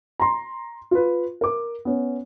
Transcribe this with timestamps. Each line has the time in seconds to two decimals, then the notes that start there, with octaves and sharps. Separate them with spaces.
0.20 A#5 C6
0.91 F4 B4
1.41 A#4 D6
1.85 B3 C#4